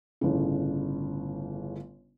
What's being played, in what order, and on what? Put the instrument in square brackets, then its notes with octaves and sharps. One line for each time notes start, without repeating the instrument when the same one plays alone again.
[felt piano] G1 A2 C#3